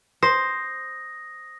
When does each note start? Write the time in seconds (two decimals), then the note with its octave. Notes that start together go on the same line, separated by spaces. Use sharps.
0.23 C5 D#6 A#6